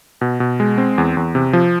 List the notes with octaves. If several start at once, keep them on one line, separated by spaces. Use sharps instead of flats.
B2
B2
G#3
C4
E2
E2
C3
F3